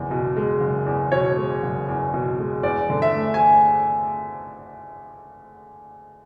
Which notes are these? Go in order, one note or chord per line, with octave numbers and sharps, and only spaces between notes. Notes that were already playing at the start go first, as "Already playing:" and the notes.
Already playing: F#1 E2
B2
G#3
F#1
E2
B2 C#5
G#3
F#1
E2
B2
G#3
E2 D5
D3
E5
A3
G#5